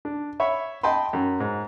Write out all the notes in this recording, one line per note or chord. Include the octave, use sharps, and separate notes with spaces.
D4
C#5 E5 B5 C#6
D#5 G5 A5 B5 C6
F#2
G#2